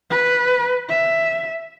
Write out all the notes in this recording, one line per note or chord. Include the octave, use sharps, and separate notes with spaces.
B4
E5